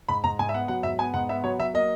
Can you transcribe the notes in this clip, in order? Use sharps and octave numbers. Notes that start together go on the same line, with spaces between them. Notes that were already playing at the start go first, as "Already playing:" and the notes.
G#2 B5
G#2 A#5
G#2 G#5
E5
B3 F#5
F#3 F#5
G#2 E5
B3 G#5
G#2 F#5
B3 E5
F#3 C#5
F#3 E5
A#3 D#5